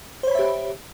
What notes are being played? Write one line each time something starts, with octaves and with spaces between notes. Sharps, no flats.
G4 C5 C#5 E5 B5